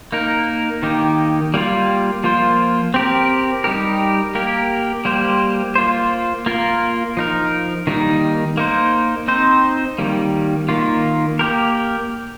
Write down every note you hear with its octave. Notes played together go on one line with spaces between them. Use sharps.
A#3 D#4 A#4
D#3 A#3 D#4 G4
G3 A#3 F4
F3 A#3 F4 C5
C4 G4 A#4
G3 D#4 G4 A#4
A#3 G4 A#4
G3 A#3 G4 C5
A#3 F4 C5
A#3 F4 A#4
F3 D#4 A#4
D#3 G3 A#3 D#4
A#3 D#4 C5
C4 D#4 C5
D#3 G3 A#3
D#3 A#3 F4
A#3 G4 A#4